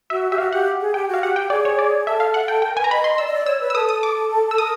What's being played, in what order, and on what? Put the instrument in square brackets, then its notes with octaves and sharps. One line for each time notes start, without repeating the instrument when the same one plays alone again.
[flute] F#4 [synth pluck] E5
[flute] G4 [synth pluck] E5
[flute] F#4 [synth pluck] F5
[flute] G4 [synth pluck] F#5
[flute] G#4
[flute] G4 [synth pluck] G5
[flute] F#4
[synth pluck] F5
[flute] G4 [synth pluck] F#5
[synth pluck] G5
[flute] G#4 [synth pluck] D5
[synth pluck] C#5
D5
[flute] A4 [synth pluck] E5
[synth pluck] F5
F#5
G5
[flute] A#4 [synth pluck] G5
[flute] B4 [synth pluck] G#5
[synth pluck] A#5
[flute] D#5 [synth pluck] B5
[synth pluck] C6
[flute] D5 [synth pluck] E6
[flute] D#5
D5
[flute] C#5 [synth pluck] E6
[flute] B4
[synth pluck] E6
[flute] A4 [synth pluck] D#6
[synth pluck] D#6
D6
E6
[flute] A#4 [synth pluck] D#6